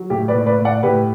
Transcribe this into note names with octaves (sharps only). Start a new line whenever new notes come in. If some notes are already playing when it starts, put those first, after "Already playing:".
Already playing: F#3
A2 G4
B4 D5
A2
B4 D5
A2
D5 F#5
A2 G4 B4